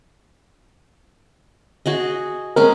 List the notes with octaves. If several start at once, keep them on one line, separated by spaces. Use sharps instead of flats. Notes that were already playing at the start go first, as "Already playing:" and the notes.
F#4 G#4 D#5
G#3 C4 C#4 A#4